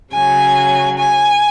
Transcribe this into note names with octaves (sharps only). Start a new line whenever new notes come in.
C#3 F#3 G#5
G#5